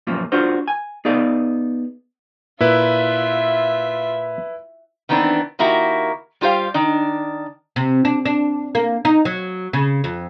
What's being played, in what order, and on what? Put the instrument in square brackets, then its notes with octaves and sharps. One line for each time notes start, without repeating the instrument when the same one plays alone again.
[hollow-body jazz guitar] F#2 A#2 F3
D4 F4 F#4 C5
G#5
B3 D#4 G#4 D5 F5
[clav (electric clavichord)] A#2 [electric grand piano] E4 B4 [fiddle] F4 E5
[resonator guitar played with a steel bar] D#3 E3 B3 C4 D4
D#3 A#3 E4 F#4 G4
G3 F4 G4 C5 F5
D#3 D4
[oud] C3
D4
D4
A#3
D#4
F#3
C#3
F2